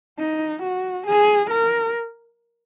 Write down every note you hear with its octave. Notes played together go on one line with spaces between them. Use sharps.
D#4
F#4
G#4
A#4